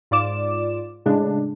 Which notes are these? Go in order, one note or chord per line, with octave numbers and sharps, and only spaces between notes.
G#2 F4 D5 D6 E7
A2 C#3 G#3 D4